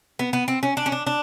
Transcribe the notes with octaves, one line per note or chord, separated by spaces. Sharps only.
B3
B3
C4
C#4
D4
C#4
D4
D4